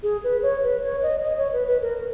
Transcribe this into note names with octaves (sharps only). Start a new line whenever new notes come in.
G#4
B4
C#5
B4
C#5
D#5
D#5
C#5
B4
B4
A#4